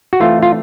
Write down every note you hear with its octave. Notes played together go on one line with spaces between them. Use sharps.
F#4
E3 A3 C4 F4
F4